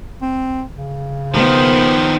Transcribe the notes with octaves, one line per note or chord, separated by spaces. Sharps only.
C4
C#3
D#3 F3 B3 C5